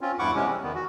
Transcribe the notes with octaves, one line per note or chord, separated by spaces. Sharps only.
C4 C#4 F4
E2 G2 E4 F#5 C#6 D6
C3 E3 G#3 C#4
G3 C4
E2 D#3 B3
F#4